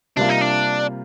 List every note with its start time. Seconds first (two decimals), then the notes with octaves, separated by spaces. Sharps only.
0.17 C3 G3 A#3 D4 F4
0.29 D#4
0.41 D4